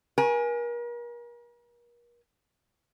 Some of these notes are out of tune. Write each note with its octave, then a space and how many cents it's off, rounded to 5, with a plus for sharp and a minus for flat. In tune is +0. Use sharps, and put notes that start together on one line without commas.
A#4 +40 G#5 +0